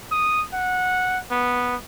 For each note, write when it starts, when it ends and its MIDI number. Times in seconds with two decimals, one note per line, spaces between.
0.12 0.43 87
0.53 1.19 78
1.31 1.76 59